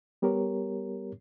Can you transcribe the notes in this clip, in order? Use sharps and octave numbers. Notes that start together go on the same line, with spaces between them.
G3 B3 G4 A#4 C#5